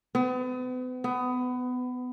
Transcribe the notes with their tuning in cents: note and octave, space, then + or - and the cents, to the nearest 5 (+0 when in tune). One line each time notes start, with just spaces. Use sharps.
B3 +40
B3 +20